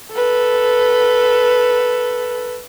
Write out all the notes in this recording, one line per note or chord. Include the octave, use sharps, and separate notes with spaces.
A4 B4